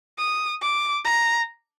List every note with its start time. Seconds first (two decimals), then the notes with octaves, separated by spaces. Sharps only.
0.19 D#6
0.62 D6
1.05 A#5